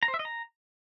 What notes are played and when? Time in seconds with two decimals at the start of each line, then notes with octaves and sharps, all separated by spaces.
0.03 A#5
0.08 C5
0.14 E5
0.19 D#5
0.25 A#5